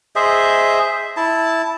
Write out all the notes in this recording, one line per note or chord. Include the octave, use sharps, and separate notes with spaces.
G#4 C5 D#5 E5
E4 A5